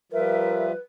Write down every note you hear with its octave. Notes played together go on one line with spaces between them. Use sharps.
F3 G3 F4 A#4 B4 E5